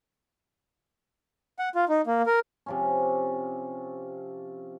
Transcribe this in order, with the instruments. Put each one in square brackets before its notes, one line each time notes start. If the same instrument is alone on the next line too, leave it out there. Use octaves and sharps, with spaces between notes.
[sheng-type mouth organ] F#5
F4
D#4
A#3
A#4
[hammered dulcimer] C3 F3 C#4